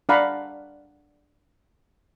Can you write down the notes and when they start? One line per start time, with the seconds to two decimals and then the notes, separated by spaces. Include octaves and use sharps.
0.09 D4 D5 F5 F#5 A#5 B5